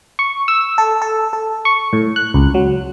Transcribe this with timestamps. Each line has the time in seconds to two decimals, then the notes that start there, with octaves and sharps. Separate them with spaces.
0.19 C#6
0.48 E6
0.78 A4
1.02 A4
1.33 A4
1.65 C#6
1.93 A2
2.16 F#6
2.34 C#2
2.54 F#3